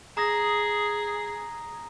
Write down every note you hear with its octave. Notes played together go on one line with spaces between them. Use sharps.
G#4 A#5 D#6 A#6